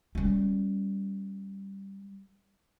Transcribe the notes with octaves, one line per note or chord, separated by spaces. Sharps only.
G3 C#4